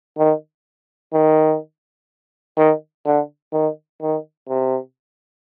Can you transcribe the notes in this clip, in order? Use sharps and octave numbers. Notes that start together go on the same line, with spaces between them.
D#3
D#3
D#3
D3
D#3
D#3
C3